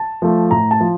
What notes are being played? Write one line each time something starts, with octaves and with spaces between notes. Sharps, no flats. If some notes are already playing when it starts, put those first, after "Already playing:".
Already playing: A5
F3 A3
A2 A#5
A5
F3